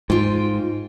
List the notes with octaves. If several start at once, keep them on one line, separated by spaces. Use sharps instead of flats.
G#2 F4 G5